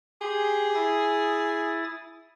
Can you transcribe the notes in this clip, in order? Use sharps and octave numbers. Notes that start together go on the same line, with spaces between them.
G4 G#4 C6
E4 D#6 A6